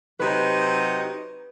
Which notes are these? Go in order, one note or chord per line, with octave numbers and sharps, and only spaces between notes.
C3 F#3 D#4 B4